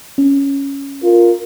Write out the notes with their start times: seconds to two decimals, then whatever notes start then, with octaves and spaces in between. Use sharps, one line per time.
0.18 C#4
1.03 F4 A#4